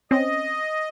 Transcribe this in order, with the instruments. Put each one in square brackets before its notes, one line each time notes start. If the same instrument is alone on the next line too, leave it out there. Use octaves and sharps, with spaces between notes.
[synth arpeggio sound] C4 C#4 [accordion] D#5